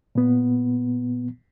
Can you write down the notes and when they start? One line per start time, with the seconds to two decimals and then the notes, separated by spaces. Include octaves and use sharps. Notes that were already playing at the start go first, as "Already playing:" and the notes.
0.15 A#2 B3